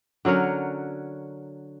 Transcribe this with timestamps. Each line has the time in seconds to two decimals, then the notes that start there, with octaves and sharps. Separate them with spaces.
0.25 D3 F#3 C#4 A#4